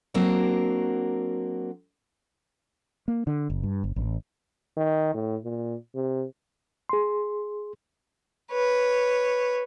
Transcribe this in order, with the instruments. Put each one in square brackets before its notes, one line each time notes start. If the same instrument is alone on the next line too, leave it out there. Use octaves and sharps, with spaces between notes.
[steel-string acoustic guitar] F#3 A#3 C4 D4 F#4 A#4
[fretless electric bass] A#3
D3
F#1
G2
G1
A1
[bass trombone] D#3
A2
A#2
C3
[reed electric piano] G#4 C6
[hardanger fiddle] B4 C#5